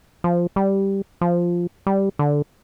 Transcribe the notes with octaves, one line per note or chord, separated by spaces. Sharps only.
F3
G3
F3
G3
D3